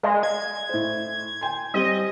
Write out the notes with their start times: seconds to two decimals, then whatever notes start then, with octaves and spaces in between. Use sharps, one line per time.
0.03 G#3 D5 D#5 F5
0.23 G#6
0.69 A2 C5
1.41 G5 G#5 C6
1.74 G3 C4 G4 D#5